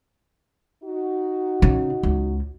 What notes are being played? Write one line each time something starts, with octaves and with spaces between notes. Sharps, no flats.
D#4 F#4
C#3
C#2